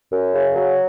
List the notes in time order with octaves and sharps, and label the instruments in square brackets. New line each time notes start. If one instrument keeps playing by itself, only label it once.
[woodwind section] F#2
C#3
F#3